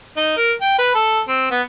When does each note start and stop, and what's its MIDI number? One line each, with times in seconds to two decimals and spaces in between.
0.17 0.32 63
0.37 0.53 70
0.61 0.74 79
0.78 0.90 71
0.94 1.20 69
1.28 1.49 60
1.51 1.61 59